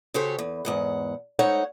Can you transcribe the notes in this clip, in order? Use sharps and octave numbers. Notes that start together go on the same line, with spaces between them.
C#3 F#4 G4 A4 C5 C#5
E2
E2 G#2 F#5
G#3 A3 D#4 C5 C#5 F#5